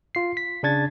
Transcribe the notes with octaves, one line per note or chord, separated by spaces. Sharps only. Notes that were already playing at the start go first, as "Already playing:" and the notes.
F4 C7
B6
C#3 D4 G#6 A6